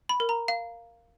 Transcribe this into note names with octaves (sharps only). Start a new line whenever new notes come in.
B5
A#4
A#5
F5